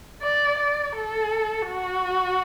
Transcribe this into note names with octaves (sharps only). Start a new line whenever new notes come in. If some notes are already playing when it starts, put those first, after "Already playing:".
D5
D5
A4
F#4